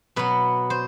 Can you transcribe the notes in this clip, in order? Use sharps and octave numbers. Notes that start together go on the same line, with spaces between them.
B2 F#3 B4
C5